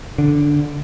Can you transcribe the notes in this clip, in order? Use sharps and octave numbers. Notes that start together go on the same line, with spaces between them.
D3